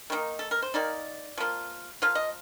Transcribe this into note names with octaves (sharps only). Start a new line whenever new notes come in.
D#3 A#3 D#4
A4
A#4
C5
D#3 A#3 D#4 D5
F3 A#3 F4
F3 A#3 F4 F5
D#5